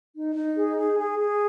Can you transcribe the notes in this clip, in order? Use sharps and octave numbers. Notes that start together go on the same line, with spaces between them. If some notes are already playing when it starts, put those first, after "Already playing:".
D#4
D#4
G#4
G#4
G#4
G#4